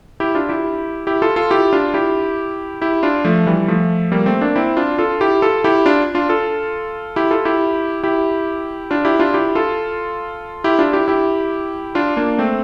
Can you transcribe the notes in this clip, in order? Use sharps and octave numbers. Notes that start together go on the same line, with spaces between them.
E4 G4
D4 F4
E4 G4
E4 G4
F4 A4
F4 A4
E4 G4
D4 F4
E4 G4
E4 G4
D4 F4
F3 A3
E3 G3
F3 A3
G3 A#3
A3 C4
A#3 D4
C4 E4
D4 F4
F4 A4
E4 G4
F4 A4
E4 G4
D4 F4
D4 F4
F4 A4
E4 G4
F4 A4
E4 G4
E4 G4
D4 F4
E4 G4
D4 F4
E4 G4
F4 A4
E4 G4
D4 F4
E4 G4
E4 G4
D4 F4
A#3 D4
A3 C4